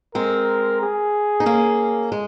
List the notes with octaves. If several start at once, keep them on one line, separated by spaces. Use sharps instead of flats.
G#3 C4 A#4
G#4
D#4
A#3 C#4
G#3